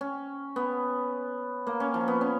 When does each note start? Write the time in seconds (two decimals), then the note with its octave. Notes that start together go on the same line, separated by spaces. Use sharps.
0.01 C#4
0.56 B3
1.67 A#3
1.80 C#4
1.94 F3
2.08 B3
2.21 C#4